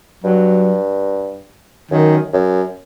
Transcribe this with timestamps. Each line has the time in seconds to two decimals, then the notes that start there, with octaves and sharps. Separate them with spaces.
0.24 G2 F#3
1.91 F#2 D#3
2.33 F#2